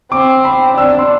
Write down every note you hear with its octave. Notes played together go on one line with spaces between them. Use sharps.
C4 D6
B5
D4 E6
E6
C6